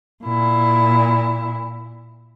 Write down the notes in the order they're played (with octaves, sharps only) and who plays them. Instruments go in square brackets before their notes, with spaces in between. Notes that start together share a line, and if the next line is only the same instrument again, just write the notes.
[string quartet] A#2 E4